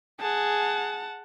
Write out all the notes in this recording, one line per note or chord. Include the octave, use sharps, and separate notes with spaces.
G#4 F#5 A5